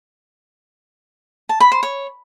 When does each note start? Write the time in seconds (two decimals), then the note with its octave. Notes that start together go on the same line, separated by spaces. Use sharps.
1.49 A5
1.60 B5
1.72 C5
1.83 C#5